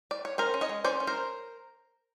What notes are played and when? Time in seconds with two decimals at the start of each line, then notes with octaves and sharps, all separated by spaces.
0.11 D5
0.25 C#5
0.38 C#4 A#4 C5
0.54 C#4
0.61 C#5 D#5
0.69 G#3
0.84 C#4 C5 D5
1.00 C#4
1.07 A#4 C5